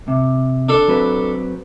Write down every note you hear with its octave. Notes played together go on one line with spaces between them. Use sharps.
C3
D4 A4 C6
F#3 C4 B4